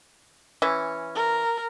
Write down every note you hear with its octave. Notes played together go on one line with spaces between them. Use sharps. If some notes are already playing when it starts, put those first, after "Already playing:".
E3 C#4
A#4